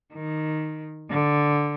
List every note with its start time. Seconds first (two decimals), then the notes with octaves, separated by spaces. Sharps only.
0.14 D#3
1.10 D3